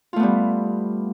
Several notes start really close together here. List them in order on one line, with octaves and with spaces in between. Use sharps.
F4 A3 B3 G3